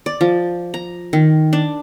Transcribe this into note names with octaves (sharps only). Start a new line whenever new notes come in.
D5
F3
A#5
D#3
D4